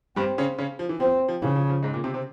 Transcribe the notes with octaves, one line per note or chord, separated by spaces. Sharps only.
G2 G3 C4
C#3 C#4
C#3 C#4
F3
E3
F3 C4
F3
C#3 E3
F3
F3
G#2 G#3
A#2 A#3
C3 C4
C3 C4